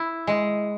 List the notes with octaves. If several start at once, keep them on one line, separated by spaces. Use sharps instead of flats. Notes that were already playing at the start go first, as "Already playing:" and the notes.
Already playing: E4
G#3